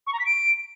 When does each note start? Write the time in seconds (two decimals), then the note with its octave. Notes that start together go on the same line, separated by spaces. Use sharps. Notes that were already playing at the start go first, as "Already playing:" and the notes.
0.06 C#6
0.13 A#5
0.19 B6
0.25 D7